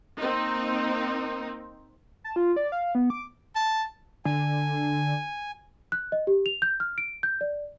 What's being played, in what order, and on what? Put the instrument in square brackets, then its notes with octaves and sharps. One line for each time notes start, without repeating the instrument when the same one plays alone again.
[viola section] A#3 C4 D#4
[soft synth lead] A5
F4
D5
F5
B3
D6
[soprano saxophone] A5
[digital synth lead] D3 [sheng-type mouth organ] G#5
[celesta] F#6
D#5
G4
F7
G6
F6
D7
G6
D5